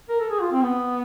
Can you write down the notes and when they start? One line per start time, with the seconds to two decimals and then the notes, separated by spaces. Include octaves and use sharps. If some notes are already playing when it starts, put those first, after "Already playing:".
0.09 A#4
0.20 A4
0.30 G#4
0.41 F4
0.52 C4
0.62 B3